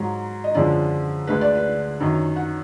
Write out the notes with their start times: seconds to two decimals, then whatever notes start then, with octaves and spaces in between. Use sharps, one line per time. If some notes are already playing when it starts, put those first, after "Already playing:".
Already playing: G#2 F#3 A#5
0.44 D#5
0.55 F#2 D3 F3 G#3 D5
1.27 D2 D3 G#3 B4
1.41 D5
1.55 B4
2.00 F#2 D#3 F#3
2.36 F#5